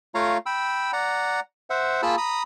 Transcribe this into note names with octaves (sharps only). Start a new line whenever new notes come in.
A3 F4 C#5 F5 A#5
G5 B5 E6
D5 F#5 A#5
C5 E5 F#5
A#3 F4 G#4 A5 B5 E6
A#5 B5 D#6